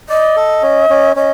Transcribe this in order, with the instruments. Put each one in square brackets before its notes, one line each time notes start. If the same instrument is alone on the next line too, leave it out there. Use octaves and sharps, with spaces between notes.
[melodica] D5 [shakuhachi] D#5
[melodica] A4
C#4
C#4
[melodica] C#4 [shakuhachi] D#5